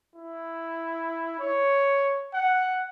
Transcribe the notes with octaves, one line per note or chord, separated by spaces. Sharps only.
E4
C#5
F#5